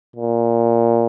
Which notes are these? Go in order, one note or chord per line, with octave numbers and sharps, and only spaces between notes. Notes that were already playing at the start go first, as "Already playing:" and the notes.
A#2